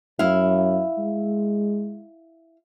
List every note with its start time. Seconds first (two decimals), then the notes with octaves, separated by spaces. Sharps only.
0.19 F#2 E4 F5
0.98 G#3